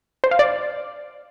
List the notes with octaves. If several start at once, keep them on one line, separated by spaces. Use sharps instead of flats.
C5
F5
D5